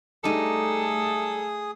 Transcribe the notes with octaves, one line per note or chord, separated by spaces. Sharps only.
G3 A3 D#4 G#4 A4 D#6